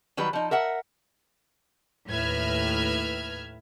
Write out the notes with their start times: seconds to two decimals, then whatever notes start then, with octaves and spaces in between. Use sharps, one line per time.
0.17 D#3 F#3 G3 B4
0.33 F3 D#4
0.51 A#4 E5 F#5
2.08 D#2 A2 B4 E5 F6 G#6